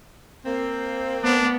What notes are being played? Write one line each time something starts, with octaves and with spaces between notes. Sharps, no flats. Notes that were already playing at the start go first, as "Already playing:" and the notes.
A#3 C4
B3 D4